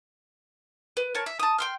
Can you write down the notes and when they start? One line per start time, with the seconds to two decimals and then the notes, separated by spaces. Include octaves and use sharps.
0.97 B4
1.15 A#4 C#5 A5
1.26 E5
1.39 A5 D#6
1.58 G5 C6 F6